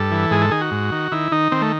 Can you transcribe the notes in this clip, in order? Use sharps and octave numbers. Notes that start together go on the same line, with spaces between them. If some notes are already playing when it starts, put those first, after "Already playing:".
Already playing: G2 A4
E3
G#2 G#4
A4
D#3 G#4
F#4
G#2
D#3
D#3 E4
D#3 D#4
D#3 C4
A3